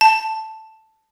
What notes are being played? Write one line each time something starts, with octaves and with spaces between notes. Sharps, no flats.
A5